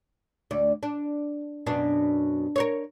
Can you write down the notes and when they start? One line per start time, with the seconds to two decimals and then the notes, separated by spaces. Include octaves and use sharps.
0.51 D2 D5
0.83 D4
1.66 F#2 B2 D4
2.56 A#4 C5 C#5